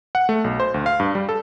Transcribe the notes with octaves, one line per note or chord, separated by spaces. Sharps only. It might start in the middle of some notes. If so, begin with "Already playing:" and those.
F#5
A3
B1
C5
D2
F5
G2
G3
A4